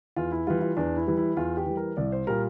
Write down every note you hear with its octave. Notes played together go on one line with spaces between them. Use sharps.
E2 F4
E4
E3 G3 F4
F4
E2 D4
E4
E3 G3
E4
E2 F4
G4
E3 G3
A#4
C2 D5
C5
A#2 G3 A#4